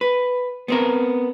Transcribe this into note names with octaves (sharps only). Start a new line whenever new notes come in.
B4
B3 C4 A#4